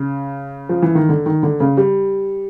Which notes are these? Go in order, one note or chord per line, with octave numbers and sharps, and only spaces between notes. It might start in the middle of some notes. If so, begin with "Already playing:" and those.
Already playing: C#3
F3
E3
D#3
D3
D#3
D3
C#3
G3